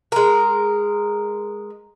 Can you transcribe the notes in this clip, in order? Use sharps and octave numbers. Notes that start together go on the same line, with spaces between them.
G#3 A#4